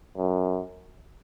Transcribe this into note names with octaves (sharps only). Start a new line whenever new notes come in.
F#2